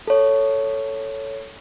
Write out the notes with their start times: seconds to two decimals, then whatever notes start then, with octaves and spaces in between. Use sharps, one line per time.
0.07 A4 C#5